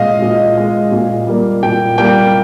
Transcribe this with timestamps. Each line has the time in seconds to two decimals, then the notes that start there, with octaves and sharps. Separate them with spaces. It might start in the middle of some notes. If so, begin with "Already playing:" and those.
Already playing: A#2 G#3 D#5 F5
0.22 A#2
0.57 G#3
0.92 A#2
1.27 G3 A#3
1.63 A#2 G5
1.98 G3 A#3 G5